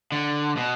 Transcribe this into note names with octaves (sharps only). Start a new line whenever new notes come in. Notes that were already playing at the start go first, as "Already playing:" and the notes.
D3
B2